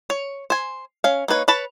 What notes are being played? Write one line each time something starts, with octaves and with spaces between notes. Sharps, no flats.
C#5
C5 G#5
C#4 F5
A#3 D#4 B4 C#5
B4 C#5 A5 B5